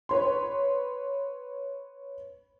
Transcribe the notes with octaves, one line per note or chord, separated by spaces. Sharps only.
B4 C#5 C6